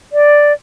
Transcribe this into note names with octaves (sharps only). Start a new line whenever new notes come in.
D5